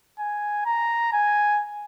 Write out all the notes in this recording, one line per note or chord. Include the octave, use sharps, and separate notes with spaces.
G#5
A#5
G#5